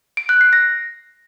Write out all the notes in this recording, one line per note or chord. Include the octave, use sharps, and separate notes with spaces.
D7
F#6
C7
A#6